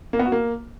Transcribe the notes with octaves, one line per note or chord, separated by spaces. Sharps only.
A#3
B3
F#4
A#3